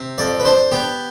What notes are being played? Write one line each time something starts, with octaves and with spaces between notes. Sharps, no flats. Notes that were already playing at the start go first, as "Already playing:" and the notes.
Already playing: C3
F2 D5
B4
D4 C5
B3 G4